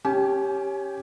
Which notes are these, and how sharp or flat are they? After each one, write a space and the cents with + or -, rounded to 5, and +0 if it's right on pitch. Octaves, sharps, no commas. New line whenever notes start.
C#4 +0 G4 +0 G#5 +30